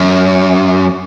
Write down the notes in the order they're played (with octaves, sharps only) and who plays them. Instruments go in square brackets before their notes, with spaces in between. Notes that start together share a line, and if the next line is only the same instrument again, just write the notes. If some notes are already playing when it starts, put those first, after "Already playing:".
Already playing: [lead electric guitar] F#2